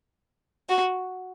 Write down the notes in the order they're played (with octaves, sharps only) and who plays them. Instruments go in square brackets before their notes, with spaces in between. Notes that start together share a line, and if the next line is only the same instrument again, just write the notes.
[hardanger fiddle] F#4